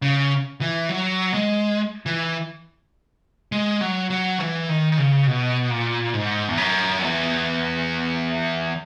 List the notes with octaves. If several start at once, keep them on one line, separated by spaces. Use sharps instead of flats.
C#3
E3
F#3
G#3
E3
G#3
F#3
F#3
E3
D#3
D#3
C#3
B2
A#2
G#2
E2
F#2
E2